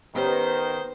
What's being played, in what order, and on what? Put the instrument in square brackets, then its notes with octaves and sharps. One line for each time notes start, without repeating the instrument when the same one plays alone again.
[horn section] D#3 [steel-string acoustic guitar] B3 [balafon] C#4 G4 C#5 [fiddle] C5